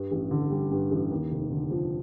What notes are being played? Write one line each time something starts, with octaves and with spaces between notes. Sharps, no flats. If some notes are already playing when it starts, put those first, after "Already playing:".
Already playing: G2
A1
D3
G3
G2
A1
D#2
F1
D3
F3